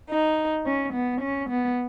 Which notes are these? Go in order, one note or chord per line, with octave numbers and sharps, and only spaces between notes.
D#4
C#4
B3
C#4
B3